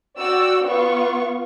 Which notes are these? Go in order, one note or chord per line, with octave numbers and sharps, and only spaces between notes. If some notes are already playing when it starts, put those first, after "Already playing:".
F#4 D5 G5 E6
B3 F4 C#6